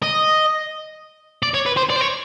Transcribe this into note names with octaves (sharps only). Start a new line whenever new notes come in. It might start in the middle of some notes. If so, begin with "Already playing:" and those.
D#5
D5
C#5
B4
C5
D5
C5
C#5